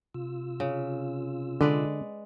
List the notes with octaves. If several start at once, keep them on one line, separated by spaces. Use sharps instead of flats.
C3 F4 E6
C#3
D3 G#3 B4 D5